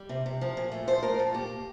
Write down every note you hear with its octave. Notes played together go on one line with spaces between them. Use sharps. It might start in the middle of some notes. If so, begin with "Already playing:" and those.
Already playing: G3
C3
C3
F3
A#2
A3
F3 C5
A3 A#4
A#2 A4
A#3 G4